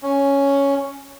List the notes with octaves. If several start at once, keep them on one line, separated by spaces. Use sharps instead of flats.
C#4